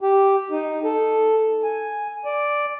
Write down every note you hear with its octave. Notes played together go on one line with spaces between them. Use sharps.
G4
D#4
A4
G#5
D5